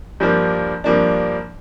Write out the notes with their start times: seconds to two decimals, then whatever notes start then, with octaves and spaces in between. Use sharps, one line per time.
0.20 G2 F3 A#3 D4
0.84 G2 F3 A#3 D4